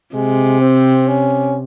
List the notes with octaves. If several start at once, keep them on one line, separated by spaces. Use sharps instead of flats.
C3 G#3
C4
C#4